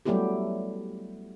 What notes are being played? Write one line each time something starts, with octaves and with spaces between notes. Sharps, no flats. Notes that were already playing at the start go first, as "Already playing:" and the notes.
F#3 G3 A3 B3 E4 G4